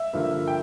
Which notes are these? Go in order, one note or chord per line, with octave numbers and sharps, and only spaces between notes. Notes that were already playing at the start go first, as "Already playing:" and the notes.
Already playing: E5
G2 D3 F3 A#3
G5